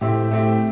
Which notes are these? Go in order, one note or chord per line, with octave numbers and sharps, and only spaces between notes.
A2 A3 C4 E4 G4
A3 C4 E4 G4